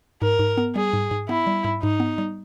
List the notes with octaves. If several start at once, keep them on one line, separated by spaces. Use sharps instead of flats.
G#2 A#4
G#2
B3
G3 G#4
G#2
G#2
B3 E4
G3
G#2
G#2 D#4
B3
G3